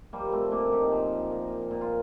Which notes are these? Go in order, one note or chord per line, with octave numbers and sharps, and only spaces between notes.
F3 G3 A#3
A3 C4
A#2 A#3 D4
D#4 G4
F3
A#2
A#2
F4